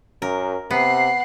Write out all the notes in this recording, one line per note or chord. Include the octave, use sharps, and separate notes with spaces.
F#2 A#4
C3 B3 F#5 C7